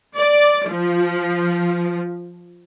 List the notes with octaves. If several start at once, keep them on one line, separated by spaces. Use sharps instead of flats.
D5
F3